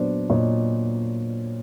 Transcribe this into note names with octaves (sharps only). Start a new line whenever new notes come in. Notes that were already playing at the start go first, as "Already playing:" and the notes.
Already playing: A#2 F#3 B3 D4 C5 D5
A#2 C#5 D#5